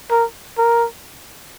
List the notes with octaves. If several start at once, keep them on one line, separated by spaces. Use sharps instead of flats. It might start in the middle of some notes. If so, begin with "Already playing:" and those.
A#4
A#4